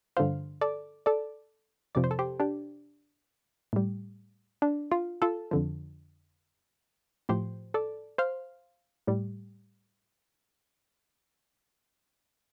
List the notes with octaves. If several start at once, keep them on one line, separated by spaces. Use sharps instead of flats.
G2 D3 F3 C5 F5
A4 D5
A4 D5
F2 C3 F3 D5
C5
A4
G4 C5
D4 G4
A2 G3
D4
F4
F4 A4
F2 D3 F3
A2 F3 G4 C5
A4 D5
C5 F5
A2 G3